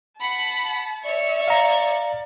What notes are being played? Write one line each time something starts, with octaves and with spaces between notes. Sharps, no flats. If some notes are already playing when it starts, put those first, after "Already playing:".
F#5 A5 B5
C#5 D5 E5 C#6
F5 A#5